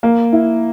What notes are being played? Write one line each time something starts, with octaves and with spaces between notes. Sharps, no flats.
A#3
E4